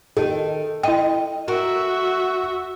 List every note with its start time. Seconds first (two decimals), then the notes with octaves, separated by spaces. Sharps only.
0.17 D#3 A4
0.83 E4 D#5 G5
1.48 F#4 A#4 E5